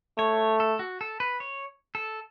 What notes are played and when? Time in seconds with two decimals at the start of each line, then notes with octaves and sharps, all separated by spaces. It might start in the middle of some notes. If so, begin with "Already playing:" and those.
0.18 A3 C#5
0.60 A4
0.79 F#4
1.01 A4
1.20 B4
1.40 C#5
1.95 A4